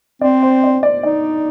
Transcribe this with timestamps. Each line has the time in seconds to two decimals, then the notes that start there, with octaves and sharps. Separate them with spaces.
0.21 C4 D5
0.43 C5
0.64 D5
0.83 D5
1.03 D#4 D5